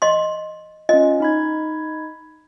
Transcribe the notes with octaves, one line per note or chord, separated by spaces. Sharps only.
D#5 C6
C#4 F4 D#5
D#4 B5 G#6